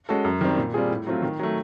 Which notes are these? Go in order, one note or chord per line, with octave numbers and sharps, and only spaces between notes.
G#3 C#4 F#4 A4
F#2
D#3 G3 C4
A#2
G3 C4 F4 G#4
A2
F#3 A3 C4 F4
D#3
F#3 A3